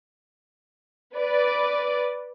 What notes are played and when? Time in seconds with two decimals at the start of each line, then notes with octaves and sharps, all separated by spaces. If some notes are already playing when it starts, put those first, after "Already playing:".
1.15 B4 D5